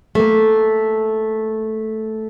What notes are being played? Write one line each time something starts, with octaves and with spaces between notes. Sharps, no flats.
A3 A#3